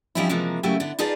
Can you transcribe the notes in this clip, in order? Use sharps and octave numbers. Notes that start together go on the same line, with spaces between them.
F3 G3 C4 C#4 D#4 E4
C3 E3 F3 G#3 A#3
C#3 F#3 A3 A#3 E4 G4
D3 B3
D#4 F4 G#4 B4 D5 A5